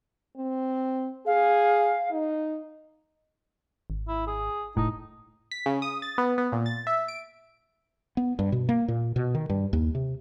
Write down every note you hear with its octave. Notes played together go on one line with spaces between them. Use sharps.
C4
G#4 F5
D#4
G#1
E4
G#4
F1 A2 D#4
B6
C#3
D#6
A6
B3
B3
A#2
A6
E5
D7
B3
G2
B2
A#3
A#2
B2
D#3
G2
D#2
C3